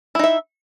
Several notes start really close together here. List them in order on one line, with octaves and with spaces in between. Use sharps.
E4 D#4 E5